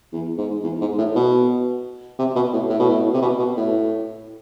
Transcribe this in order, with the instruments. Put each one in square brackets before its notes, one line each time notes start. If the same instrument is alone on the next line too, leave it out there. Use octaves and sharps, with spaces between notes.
[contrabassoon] E2
G#2
E2
G#2
A2
B2
C3
B2
A2
A2
B2
A2
C3
B2
B2
A2